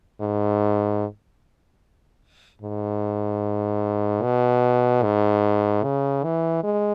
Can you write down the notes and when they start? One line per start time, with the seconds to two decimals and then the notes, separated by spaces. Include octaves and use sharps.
0.21 G#2
2.62 G#2
4.22 B2
5.03 G#2
5.83 C#3
6.24 E3
6.64 G#3